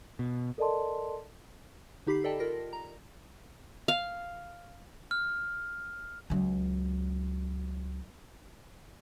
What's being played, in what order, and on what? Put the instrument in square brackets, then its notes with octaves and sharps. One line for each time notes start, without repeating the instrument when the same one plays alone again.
[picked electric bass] B2
[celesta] A4 A#4 D5 D#5 A5 C6
[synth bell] D3 D#4 G4 B5 B6 C7
A4 D5 D#5 G5 A5
F4 A#4 A#6
A#5
[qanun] F5
[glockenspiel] F6
[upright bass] C#2 F#3